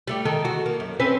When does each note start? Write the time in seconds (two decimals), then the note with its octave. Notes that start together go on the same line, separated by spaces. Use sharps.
0.07 G3 A3 G4
0.25 D#3 G#3 A4
0.45 F#4
0.66 A#3
0.80 F#2
1.00 C4 C#4 B4